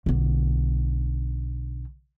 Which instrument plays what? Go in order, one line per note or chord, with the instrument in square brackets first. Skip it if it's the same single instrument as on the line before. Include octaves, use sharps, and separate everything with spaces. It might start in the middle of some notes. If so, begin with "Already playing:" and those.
[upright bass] B1 D3